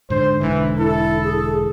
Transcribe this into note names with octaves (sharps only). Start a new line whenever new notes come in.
G#2 D3 C5
E1 G#2 D3 E3
E4 A4
G#4